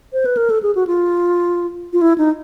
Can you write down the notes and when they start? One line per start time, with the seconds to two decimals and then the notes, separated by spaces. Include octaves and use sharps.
0.13 C5
0.26 B4
0.37 A#4
0.50 A4
0.63 G#4
0.75 F#4
0.87 F4
1.93 F4
2.02 E4
2.18 D#4